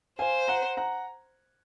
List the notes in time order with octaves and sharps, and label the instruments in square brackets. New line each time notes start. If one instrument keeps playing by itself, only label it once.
[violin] C5 [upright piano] F5 G#5
[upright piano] F#5 A#5
F#5 A#5